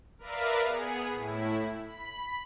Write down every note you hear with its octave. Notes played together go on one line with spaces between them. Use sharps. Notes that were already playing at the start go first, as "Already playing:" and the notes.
A#4 B4 D5 E5 F5
B3 G#4
A2 E4
B5